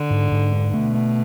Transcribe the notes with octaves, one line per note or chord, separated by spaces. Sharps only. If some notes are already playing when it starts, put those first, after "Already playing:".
Already playing: D3
G#2
G#2
D4
B2 A3
A3